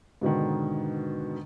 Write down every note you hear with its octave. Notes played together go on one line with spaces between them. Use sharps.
G#2 B2 D3 D#3